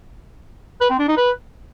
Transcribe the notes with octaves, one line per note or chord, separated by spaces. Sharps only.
B4
C4
D4
D#4
B4